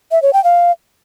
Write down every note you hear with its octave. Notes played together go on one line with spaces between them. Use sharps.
E5
C#5
G5
F5